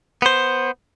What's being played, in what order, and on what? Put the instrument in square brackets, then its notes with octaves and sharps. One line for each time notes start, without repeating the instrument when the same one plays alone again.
[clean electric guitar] B3 C5